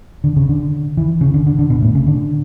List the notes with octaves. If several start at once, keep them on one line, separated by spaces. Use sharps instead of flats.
D3
C#3
D3
E3
C#3
D3
D3
D3
B2
A2
C#3
D3